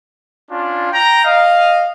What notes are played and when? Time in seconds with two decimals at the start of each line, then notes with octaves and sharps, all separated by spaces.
0.51 C#4 D4 F4
0.92 G5 A#5
1.24 D#5 F5